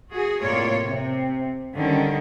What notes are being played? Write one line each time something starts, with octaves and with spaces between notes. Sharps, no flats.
F#4 G#4
A2 C3 A#3 F4 C#5 D5
C3
D3 D#3 G3 C#4